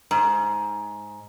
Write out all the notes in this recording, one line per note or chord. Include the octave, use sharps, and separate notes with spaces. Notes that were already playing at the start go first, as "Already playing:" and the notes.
G#2